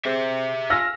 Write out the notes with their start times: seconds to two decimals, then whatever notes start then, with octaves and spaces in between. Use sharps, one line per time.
0.06 C4 G4 G#4 E5
0.70 F4 F5 G#5 E6 F6 A#6